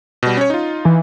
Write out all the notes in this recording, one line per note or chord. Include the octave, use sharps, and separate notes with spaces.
B2 G3
C#4 C#5
D#4 F4
E3